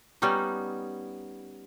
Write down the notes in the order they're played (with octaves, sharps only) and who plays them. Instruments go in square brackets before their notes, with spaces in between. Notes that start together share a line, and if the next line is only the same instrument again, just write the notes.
[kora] G3 B3 C#4 D#4